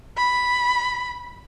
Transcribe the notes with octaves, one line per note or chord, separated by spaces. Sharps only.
B5